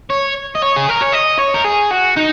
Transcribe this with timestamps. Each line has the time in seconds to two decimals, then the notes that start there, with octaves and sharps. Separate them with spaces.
0.10 C#5
0.55 D#5
0.62 C#5
0.76 G#4
0.89 A#4
1.02 C#5
1.13 D#5
1.39 C#5
1.54 A#4
1.64 G#4
1.91 F#4
2.16 D#4